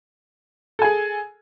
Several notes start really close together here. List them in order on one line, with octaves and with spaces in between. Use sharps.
A4 G#5 G#4